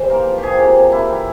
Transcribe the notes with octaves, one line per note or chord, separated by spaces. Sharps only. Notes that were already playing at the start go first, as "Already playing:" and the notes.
Already playing: E3 G3 C5
A#3 A#4
F3
G4
F3 G#4
C3 G4
C3
A#3 E4
E3